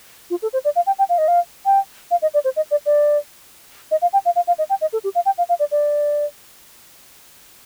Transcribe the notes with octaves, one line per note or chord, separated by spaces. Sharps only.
F4
A4
C5
D5
F5
G5
G5
F5
D#5
F5
G5
F5
D#5
D5
C5
D#5
D5
D5
D#5
F5
G5
F5
F5
F5
D#5
G5
D#5
A4
G4
F5
G5
F5
F5
D5
D5